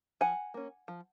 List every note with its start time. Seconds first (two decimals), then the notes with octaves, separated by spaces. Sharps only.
0.21 F3 F#5 G#5
0.54 A#3 C#4
0.88 F3